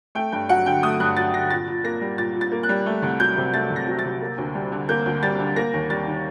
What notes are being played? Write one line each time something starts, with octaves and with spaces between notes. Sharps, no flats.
A3 G5
G2 G5
F#3 F#5
D3 G5
A3 D#6
G2 F#6
F#3 A6
D3 A#6
A#2 A6
A#2
A#3 A#6
G3
A#2 A6
A#2
A6
A#3
F#6
G3
A3
C2
F#3 G6
C3
A3 A6
C2
A#6
F#3
A6
C3
A#3
D2
G3
D3
A#3 G6
D2
G3 A6
D3
A#3 A#6
D#2
G3 A6
D#3